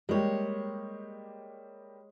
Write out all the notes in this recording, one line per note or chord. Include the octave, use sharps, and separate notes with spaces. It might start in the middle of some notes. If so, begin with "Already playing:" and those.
G3 G#3 A#3 G4 C#5